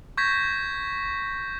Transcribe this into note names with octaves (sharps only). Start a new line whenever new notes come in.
C#6 G6 G#6 A#6 B6